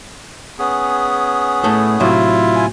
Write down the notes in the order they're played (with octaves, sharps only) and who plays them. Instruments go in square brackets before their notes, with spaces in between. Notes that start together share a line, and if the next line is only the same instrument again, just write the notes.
[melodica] B3 C#4 G#4
[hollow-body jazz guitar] A2 A3 A4
[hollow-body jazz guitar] A2 C3 F#3 [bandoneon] E4 F4
[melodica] G#5